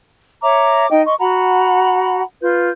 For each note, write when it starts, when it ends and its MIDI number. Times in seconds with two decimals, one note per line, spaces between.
0.42 0.88 73
0.42 0.88 76
0.42 0.88 82
0.42 0.88 86
0.89 1.03 63
0.89 1.03 75
0.89 1.03 79
1.06 1.15 75
1.06 1.15 84
1.06 1.15 85
1.19 2.23 66
1.19 2.23 78
1.19 2.23 82
1.19 2.23 83
2.42 2.68 65
2.42 2.68 71
2.42 2.68 91